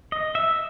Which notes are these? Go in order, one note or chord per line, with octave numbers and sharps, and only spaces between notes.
D#5
E5